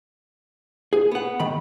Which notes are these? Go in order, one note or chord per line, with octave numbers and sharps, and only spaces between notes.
G#4
B3 F#5
D#3 B5